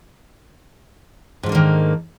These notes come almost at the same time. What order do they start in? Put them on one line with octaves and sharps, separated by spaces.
G#2 F3 D3 A#3 D#3